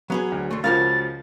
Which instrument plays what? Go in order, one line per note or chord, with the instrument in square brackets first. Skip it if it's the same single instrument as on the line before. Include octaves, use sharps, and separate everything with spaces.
[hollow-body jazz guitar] F#3 C#4 G#4 [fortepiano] B3
[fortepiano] D2
[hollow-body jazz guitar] D3 A3
[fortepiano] C#2 F3 [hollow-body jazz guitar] F#4 A#4 F5 [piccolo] A6